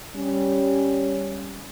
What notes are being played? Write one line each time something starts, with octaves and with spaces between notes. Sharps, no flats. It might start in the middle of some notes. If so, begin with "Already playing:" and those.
G3 C#4